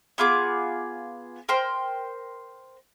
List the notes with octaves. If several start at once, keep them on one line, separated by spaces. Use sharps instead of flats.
B3 F4 G#4 D6
A#4 C5 G5 C6